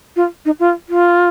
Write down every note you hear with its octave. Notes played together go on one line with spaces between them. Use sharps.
F4
D#4
F4
F4